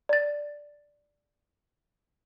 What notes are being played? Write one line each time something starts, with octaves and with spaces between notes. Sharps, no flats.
D5 A6